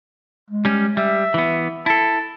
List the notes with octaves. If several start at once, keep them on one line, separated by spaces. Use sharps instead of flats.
G#3
G3 C#4
G3 E5
E3 B3
E4 A4 A5